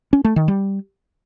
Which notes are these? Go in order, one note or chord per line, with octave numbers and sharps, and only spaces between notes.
C#4
A3
D#3
G3